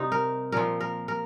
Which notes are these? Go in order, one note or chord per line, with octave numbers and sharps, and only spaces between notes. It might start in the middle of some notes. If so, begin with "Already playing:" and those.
Already playing: C3 G3 C4 D#4
A#4
A#2 F3 A#4
A#4
A#4